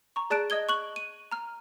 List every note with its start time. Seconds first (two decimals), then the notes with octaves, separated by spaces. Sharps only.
0.16 A#5 C#6
0.30 G#4 D5 A5 F#6 D7
0.50 D#5 D#6 G#6 G7
0.69 C#6 F#6 F#7
0.96 D#7
1.32 A#5 F6